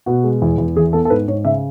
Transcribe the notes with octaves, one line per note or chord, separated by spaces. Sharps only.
B2 F#4
G#3
E2
E2
E3 G#4
B3 A4
A4
G#2 B4
G#2 C#5
C#3 E5